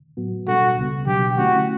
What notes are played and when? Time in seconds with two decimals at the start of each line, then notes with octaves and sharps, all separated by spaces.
0.17 A2 F#3 B3 F#4
0.48 B2 G3 D4 F#4 A4
0.77 C#2 C#3 G3 B3
1.07 B2 F#3 B3 D4 G4
1.37 D3 A3 C#4 E4 F#4